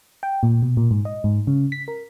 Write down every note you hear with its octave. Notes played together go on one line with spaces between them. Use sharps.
G5
A#2
B2
A#2
G#2
D#5
G#2
C#3
B6
A#4